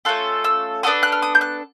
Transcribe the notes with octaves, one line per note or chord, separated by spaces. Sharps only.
A3 C#4 F4 A4 F#6
E6
B3 D4 F#4 A4 D#6
F#6
F6
D#6
G6
F#6